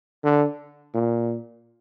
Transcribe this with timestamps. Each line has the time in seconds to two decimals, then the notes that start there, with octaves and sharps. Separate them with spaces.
0.24 D3
0.94 A#2